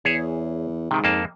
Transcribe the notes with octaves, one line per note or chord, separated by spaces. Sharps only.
E2 G#4 C#5 E5
G#2 C3 D#3
F2 A#3 A5